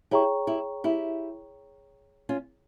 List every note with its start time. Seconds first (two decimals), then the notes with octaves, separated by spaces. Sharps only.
0.11 E4 G4 G#4 C#5 G5 A#5 C#6
0.47 E4 G4
0.84 E4 G4
2.29 C#4 F4